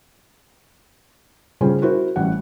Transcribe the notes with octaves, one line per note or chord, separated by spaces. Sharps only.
C#3 G3 C#4 F4 G#4 C5
E4 F#4 A#4 C5
A1 G3 C#4 F#5